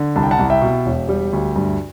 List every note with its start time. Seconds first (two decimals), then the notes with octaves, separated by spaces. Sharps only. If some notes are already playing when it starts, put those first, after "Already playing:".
Already playing: D3
0.16 C2 A5
0.23 G5
0.31 F#5 A5
0.39 C2
0.50 E5 G5
0.61 B2
0.86 E1
1.09 G3
1.33 D2
1.56 G2